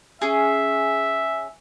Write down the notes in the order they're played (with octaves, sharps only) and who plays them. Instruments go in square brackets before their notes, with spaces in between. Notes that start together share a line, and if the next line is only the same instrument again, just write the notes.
[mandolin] C#4 G#4 [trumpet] E5